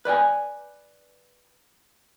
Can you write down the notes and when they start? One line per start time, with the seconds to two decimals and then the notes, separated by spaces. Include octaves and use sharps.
0.05 B4 D5 G5 G#5